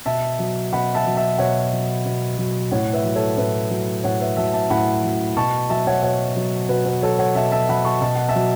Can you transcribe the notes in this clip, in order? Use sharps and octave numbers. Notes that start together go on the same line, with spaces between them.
B2 E5 A5
F#3
B2 F#5 B5
E5 A5
F#3
E5 A5
B2 C#5 F#5
F#3
B2
F#3
A2 C#5 F#5
B4 E5
F#3
A4 C#5
A2 B4 E5
F#3
A2 C#5 F#5
B4 E5
F#3 E5 A5
E5 A5
A2 F#5 B5
F#3
B2 A5 C#6
F#3 E5 A5
C#5 F#5
B2 C#5 F#5
F#3
B2 F#4 B4
F#4 B4
F#3 A4 C#5
C#5 F#5
B2 E5 A5
E5 A5
F#3 F#5 B5
A5 C#6
B2 A5
F#5
E5 A5
F#3